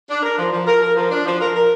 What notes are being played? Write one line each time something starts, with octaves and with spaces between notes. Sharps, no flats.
D4
A#4
F3
F3
A#4
A#4
F3
D4
F3
A#4
A#4